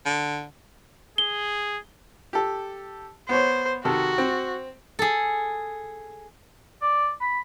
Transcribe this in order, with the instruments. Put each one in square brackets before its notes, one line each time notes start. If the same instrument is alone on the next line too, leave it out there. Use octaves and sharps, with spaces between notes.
[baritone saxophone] D3
[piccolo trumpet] G#4 [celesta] G7
[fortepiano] G4 A4
[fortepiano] B3 C#5 [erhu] C5
[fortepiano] C3 D#3 A4 [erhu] F#4
[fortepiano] C4
[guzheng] G#4 A4
[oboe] D5
B5